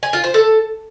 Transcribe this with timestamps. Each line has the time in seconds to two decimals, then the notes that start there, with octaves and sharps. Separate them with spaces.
0.03 G#5
0.13 F4
0.24 C5
0.34 A4